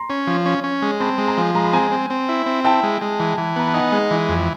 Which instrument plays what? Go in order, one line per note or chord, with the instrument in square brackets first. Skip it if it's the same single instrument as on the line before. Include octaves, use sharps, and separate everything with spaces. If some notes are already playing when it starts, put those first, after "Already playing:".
Already playing: [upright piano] A#5 C6
[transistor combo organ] C#4
F3
C#4
C#4
G#3
[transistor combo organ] C4 [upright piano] A5 B5
[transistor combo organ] G#3
[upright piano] G#5 A#5
[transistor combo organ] F3
[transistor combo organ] G#3 [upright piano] A#5
[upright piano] B5
[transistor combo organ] C4 [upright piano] G#5 A#5
[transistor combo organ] C4
C4
E4
C4
[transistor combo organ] E4 [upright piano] G5 A5
[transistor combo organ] G#3
G#3
E3
E3
[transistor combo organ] B3 [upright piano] A#5
[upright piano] A5
[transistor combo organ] D#4 [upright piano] F#5 G#5
[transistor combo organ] G#3
E3
F2